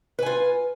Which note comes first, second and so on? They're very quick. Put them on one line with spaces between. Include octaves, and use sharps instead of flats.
B4 G#5 F4